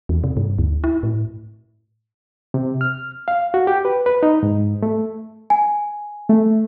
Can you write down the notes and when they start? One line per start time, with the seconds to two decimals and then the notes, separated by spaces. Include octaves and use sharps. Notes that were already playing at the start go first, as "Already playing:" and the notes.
0.09 E2
0.24 C3
0.37 G2
0.59 D2
0.84 E4
1.03 A2
2.54 C3
2.81 F6
3.28 F5
3.54 F#4
3.67 G4
3.85 B4
4.06 B4
4.23 D#4
4.43 G#2
4.82 A3
5.50 G#5
6.29 A3